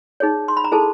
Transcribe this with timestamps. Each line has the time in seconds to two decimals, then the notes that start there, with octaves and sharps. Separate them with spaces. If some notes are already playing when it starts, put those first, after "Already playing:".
0.20 D#4 G#4 C#5
0.48 C6
0.57 B5
0.64 A#5
0.72 E4 G#4 A4 C5 A5